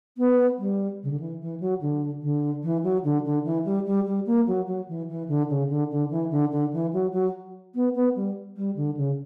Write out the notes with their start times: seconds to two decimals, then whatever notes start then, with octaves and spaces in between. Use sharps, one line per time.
0.18 B3
0.59 G3
1.03 C#3
1.11 D3
1.20 E3
1.41 E3
1.60 F#3
1.81 D3
2.22 D3
2.63 E3
2.84 F#3
3.04 D3
3.25 D3
3.44 E3
3.65 G3
3.86 G3
4.06 G3
4.26 A#3
4.47 F#3
4.67 F#3
4.89 E3
5.09 E3
5.28 D3
5.50 C#3
5.69 D3
5.91 D3
6.10 E3
6.31 D3
6.51 D3
6.73 E3
6.93 F#3
7.13 F#3
7.75 B3
7.95 B3
8.16 G3
8.57 G3
8.76 D3
8.97 C#3